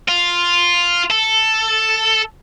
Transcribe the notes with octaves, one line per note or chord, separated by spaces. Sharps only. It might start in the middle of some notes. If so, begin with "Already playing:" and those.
F4
A4